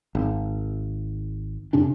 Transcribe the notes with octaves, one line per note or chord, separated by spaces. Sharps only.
G#1
F2 C3 C#4 D4